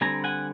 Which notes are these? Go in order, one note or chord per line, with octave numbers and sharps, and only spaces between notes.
D3 G3 C4 G#5 A#5
F#5 G#5